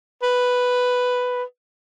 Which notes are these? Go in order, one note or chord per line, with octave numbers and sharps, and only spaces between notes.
B4